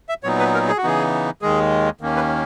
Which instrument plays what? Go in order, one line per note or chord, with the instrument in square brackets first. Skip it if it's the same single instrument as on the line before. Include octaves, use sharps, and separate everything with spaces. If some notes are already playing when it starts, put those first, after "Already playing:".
[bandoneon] E5
A#2 F#3 B3 D#4 C#5
B4
A#4
G#4
F#4
C#3 E3 B3 D#4 G#4
D#2 D#3 G#3 G#4
D#2 D#3 A#3 C#4
B4